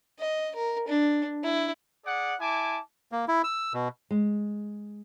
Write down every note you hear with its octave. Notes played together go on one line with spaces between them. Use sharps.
D#5
A#4
D4
E4
G#4 D5 F#5
E4 G#5 A5 D6
A#3
E4
E6
B2
G#3